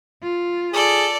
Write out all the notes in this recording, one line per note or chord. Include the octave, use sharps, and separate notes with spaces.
F4
G#4 A4 D5